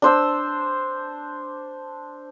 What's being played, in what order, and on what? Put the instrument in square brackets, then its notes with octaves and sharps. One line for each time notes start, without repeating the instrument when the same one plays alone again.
[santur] D4 C5 E6